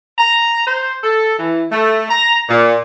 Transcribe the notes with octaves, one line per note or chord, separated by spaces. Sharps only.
A#5
C5
A4
E3
A3
A#5
A#2